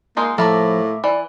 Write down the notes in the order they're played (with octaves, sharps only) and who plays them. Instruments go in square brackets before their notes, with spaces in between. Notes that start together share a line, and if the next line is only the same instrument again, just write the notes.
[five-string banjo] G#3 D#4 F4 [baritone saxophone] A#3
[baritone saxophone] A2 [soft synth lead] F3 [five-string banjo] A#3 A4 [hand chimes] E5 B5 D6
[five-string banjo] E3 [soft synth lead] D5